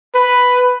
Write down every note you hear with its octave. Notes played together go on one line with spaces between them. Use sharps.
B4